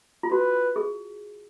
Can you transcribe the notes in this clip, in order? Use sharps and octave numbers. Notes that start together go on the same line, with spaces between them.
F4
F#4 B4
G#4